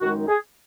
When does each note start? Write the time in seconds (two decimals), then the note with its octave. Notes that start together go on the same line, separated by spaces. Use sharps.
0.01 F#2 D#3 G#3 D#4 F#4
0.28 G#4